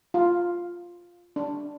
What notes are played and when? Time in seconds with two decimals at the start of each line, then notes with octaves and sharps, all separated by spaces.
0.14 F4
1.36 D4